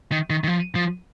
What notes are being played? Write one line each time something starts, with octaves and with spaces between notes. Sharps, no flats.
D#3
D#3
D#3
F3
F3